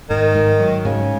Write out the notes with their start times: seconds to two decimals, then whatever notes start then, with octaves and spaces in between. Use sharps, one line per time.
0.10 G#2 D#3
0.34 G#2
0.60 F#3
0.85 G#2 C#3